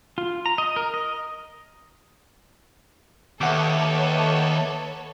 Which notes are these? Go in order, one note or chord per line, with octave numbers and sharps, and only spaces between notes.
F4
A#5
D#5
A#4
D#5
D#2 A4 B4 C#5 E5 F#5 D6